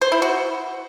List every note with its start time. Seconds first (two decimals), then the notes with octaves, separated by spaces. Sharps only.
0.01 C5
0.12 E4
0.22 F#4